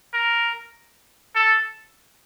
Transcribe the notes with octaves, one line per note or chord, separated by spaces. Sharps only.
A#4
A4